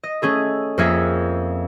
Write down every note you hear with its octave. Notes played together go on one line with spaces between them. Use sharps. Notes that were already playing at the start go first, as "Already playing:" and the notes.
D#5
A3 C#4 G#4 A4
F2 A#3 G#4 E5 C#7